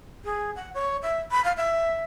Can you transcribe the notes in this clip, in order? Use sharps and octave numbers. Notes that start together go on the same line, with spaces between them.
G#4
F#5
C#5
E5
B5
F5
E5